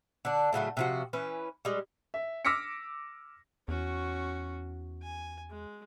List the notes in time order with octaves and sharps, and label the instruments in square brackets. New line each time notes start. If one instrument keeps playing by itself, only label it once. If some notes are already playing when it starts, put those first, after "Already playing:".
[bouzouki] D3 D4
A2 C#3 F#3 A3
C3 F3 F#4
E3 C#4 B4
G3 G#3
[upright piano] E5
D6 E6 F6 A#6 B6 C#7
[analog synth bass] E2 [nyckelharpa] C#4 F#4
[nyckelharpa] G#5
G#3